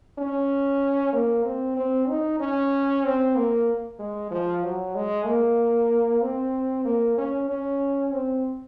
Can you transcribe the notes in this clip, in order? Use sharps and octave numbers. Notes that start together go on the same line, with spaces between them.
C#4
A#3
C4
C4
D#4
C#4
C4
A#3
G#3
F3
F#3
G#3
A#3
C4
A#3
C#4
C#4
C4